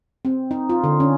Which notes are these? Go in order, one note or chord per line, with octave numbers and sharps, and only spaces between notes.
C4
D#4
F4
D3
C#4